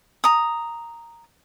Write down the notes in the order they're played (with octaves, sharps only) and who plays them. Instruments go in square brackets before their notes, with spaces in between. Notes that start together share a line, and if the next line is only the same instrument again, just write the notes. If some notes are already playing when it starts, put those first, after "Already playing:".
[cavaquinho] A#5 D#6